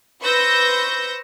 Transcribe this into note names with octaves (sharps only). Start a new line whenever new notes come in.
B4 C5 C#6 E6 G6 A#6